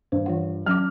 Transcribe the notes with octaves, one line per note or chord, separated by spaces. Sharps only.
G2 C5
E3 F4 F#5
F#3 C#4 D6 F6